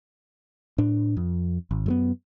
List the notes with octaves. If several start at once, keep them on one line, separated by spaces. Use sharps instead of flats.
A2 D4
F2
G#1
F#2 G#3 B3